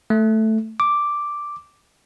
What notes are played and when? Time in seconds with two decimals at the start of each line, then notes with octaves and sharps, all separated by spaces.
0.10 A3
0.80 D6